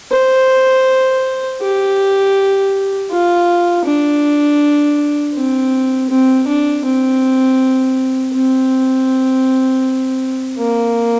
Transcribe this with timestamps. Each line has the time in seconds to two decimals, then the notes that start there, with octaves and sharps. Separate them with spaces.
0.11 C5
1.61 G4
3.11 F4
3.85 D4
5.35 C4
6.10 C4
6.47 D4
6.85 C4
8.33 C4
10.58 A#3